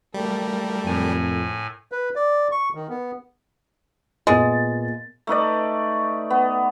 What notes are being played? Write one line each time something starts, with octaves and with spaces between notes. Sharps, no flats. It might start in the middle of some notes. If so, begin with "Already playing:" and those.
G3 A3 A#3
F2 A2 G#5
B4
D5
C#6
D#3
B3
A#2 G#3 B3 A6
A3 D#4 B4 D5
B3